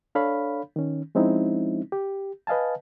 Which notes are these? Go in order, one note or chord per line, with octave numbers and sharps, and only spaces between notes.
D4 A4 C#5 F5 B5
D#3 C#4
F3 G#3 C4 C#4 D#4 E4
G4
B4 D#5 F5 G#5 A5